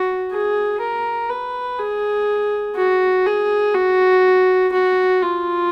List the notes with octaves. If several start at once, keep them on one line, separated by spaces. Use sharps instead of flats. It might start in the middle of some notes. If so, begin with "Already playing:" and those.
Already playing: F#4
G#4
A#4
B4
G#4
F#4
G#4
F#4
F#4
F4